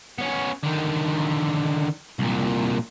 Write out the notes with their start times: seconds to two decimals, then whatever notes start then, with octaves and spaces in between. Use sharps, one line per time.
0.18 B3 C#4
0.63 D3 D#3
2.19 C2 A#2